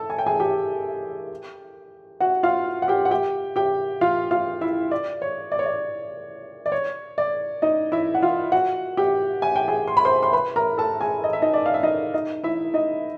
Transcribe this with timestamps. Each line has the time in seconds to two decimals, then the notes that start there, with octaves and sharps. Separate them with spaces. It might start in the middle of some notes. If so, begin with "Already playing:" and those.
Already playing: A4 A5
0.10 G#5
0.19 G5
0.26 G#4 G#5
0.40 G4 G5
2.20 F#4 F#5
2.43 F4 F5
2.82 F#5
2.88 G4 G5
3.05 F#5
3.11 G4 G5
3.56 G4 G5
4.01 F4 F5
4.31 F4 F5
4.61 E4 E5
4.91 D5
5.22 C#5
5.52 D5
5.59 C#5
5.66 D5
6.66 D5
6.72 C#5
7.18 D5
7.62 D#4 D#5
7.92 E4 E5
8.15 F#5
8.22 F4 F5
8.52 F#4 F#5
8.97 G4 G5
9.42 G#5
9.56 G5
9.68 G#4 G#5
9.87 C6
9.97 B5
10.05 C5 C6
10.23 C6
10.33 B4 B5
10.56 A#4 A#5
10.78 A4 A5
11.01 G#4 G#5
11.24 D#5
11.33 E5
11.42 D#4 D#5
11.54 D5
11.66 F5
11.74 E5
11.83 D#4 D#5
12.14 D#4 D#5
12.44 E4 E5
12.74 D#4 D#5